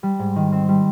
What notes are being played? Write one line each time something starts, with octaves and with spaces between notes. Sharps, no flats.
G3
G#2
D#3
C4
G3